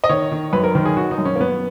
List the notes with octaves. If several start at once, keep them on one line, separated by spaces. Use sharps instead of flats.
D#5
D#3 C#5
D#3
F#2 B4
A#4
D#3 A#4
G#4
D#3 F#4
D#4
F#2
C#4
A#3
F#2 B3